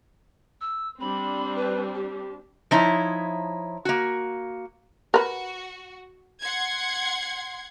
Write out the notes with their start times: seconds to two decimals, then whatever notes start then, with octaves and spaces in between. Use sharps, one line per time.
0.61 E6
1.01 G3 C4 D4 B5
1.56 B4
1.95 G4
2.71 F3 D#4 E4 C#5
3.85 A#3 F#4
5.14 F#4 A#4 B4
6.41 F#5 C6 G#6